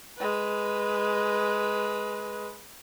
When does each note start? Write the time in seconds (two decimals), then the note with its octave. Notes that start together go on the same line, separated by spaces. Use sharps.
0.17 G#3 B4